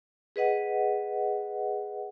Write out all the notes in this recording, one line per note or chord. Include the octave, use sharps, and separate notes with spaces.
G#4 B4 D#5 F#5